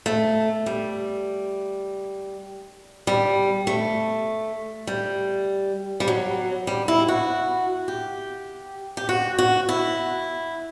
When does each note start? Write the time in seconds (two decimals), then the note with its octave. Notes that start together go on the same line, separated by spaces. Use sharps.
0.06 A3
0.66 G3
3.07 G3
3.67 A3
4.87 G3
6.00 G3
6.08 F#3
6.67 G3
6.88 E4
7.08 F#4
7.88 G4
8.97 G4
9.09 F#4
9.38 F#4
9.69 E4